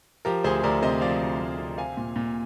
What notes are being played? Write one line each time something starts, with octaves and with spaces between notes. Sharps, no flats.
F3 G4 A#4
D2 G#4 C5
D2 A#4 D5
C3 C5 D#5
F3 D5 F5
D2
D2
C3
C4 F5 G#5
A#2
A#2